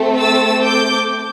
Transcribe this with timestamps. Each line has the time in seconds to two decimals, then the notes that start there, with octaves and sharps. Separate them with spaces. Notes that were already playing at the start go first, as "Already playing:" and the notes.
Already playing: A3 C4 A4
0.19 E6 A6
0.63 D6 G6